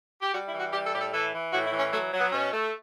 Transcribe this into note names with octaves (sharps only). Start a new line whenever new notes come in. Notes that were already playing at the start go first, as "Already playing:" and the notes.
G4
G3 F#4
E4
E3
F#4
G3 G4
A4
A2 G4
A4
E3 A4
E3
A2 F#4
E4
E3
C#4
F#3 A3
F#3
B3
B2 C#4
A3